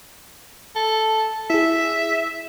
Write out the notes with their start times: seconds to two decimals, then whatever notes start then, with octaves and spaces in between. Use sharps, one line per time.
0.76 A4
1.50 E4 G#4 E5